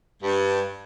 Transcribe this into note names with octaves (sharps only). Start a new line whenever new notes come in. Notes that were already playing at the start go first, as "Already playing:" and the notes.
G2